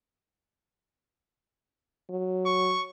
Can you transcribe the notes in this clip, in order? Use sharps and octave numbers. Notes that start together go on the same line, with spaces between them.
F#3
C#6